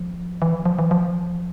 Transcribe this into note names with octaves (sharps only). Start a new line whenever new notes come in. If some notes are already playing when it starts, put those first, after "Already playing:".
Already playing: F3
E3
F3
F3
E3
F3